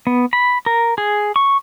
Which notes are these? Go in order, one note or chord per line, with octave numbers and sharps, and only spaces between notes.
B3
B5
A#4
G#4
C#6